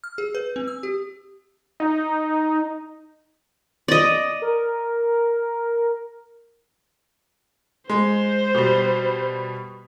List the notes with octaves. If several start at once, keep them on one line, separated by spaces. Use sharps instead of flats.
F6
G#4
B4
C4
E6
G4
D#4
D5 D#5
A#4
G#3 C5
B2 G3